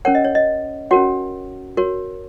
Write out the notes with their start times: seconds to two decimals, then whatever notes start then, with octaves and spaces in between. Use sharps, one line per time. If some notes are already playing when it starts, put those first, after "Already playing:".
0.05 C#4 A#4 C#5 F#5
0.15 D#5
0.24 C#5
0.35 D#5
0.91 C#4 F#4 A#4 C#5 F#5
1.77 F#4 A#4 C#5